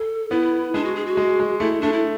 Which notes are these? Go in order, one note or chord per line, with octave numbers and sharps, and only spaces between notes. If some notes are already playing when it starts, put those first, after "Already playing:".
Already playing: A4
B3 E4
G#3 D4
F#4
G#4
F#4
G#3
G#3
A3 E4
A3 D4
E4